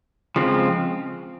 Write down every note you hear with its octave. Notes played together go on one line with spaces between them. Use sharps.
C#3 F3 G#3 C4 F4